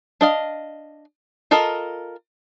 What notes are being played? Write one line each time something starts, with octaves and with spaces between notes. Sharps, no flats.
D4 D#5 F5
F4 A4 A#4 D#5